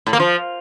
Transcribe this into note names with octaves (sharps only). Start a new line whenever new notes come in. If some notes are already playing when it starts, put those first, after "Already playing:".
A2
A#3
F3